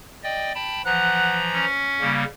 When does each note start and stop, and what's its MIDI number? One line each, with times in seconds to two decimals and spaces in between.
0.24 0.52 74
0.24 0.52 75
0.24 0.52 79
0.55 0.82 79
0.55 0.82 81
0.55 0.82 83
0.86 1.65 52
0.86 1.65 53
0.86 1.37 78
0.86 1.65 82
1.54 2.13 61
2.01 2.24 49
2.01 2.24 55
2.01 2.24 58